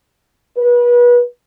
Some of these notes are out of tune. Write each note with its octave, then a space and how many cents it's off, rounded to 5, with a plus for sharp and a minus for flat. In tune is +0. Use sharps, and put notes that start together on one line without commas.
B4 -30